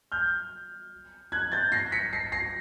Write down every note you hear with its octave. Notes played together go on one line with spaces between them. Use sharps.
F6 G6
F#6 G#6
G6 A6
A#6 C7
B6 C#7
A#6 C7
A#6 C7